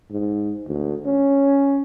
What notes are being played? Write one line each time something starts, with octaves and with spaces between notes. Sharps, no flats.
G#2
D2
C#4